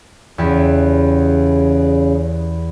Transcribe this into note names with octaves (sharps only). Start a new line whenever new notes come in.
E2 C#3 G4